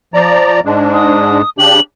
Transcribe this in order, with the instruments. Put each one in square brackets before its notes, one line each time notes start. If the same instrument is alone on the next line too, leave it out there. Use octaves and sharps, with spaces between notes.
[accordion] F3 D5 A#5
G#2 G#3 D4
[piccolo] D#6
[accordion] C#3 D4 G4 [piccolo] F#7